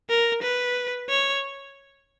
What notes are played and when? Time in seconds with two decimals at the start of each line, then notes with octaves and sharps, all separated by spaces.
0.09 A#4
0.43 B4
1.09 C#5